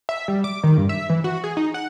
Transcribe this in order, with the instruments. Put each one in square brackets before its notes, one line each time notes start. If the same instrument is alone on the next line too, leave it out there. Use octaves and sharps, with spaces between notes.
[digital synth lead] E5
G3
D6
D#3
G2
E5
E3
F#4
G#4
D#4
F#5